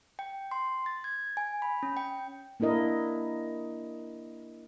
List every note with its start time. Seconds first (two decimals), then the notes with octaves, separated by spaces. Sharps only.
0.19 G5
0.51 C6
0.86 A6
1.04 G#6
1.37 G#5
1.62 B5
1.83 C#4
1.97 G5
2.60 A#3 D4 E4 A#4 D#5